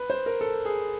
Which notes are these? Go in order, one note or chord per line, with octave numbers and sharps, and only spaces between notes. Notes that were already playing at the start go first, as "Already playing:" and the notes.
Already playing: B4
C5
A#4
A4
G#4